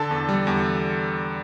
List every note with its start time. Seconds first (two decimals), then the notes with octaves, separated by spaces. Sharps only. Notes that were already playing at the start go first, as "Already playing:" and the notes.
Already playing: D3 A4 A5
0.11 E2
0.29 G3
0.47 E2